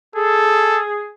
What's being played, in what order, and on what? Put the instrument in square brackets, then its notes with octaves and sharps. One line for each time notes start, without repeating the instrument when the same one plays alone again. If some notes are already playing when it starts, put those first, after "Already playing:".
[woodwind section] G#4 [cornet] A4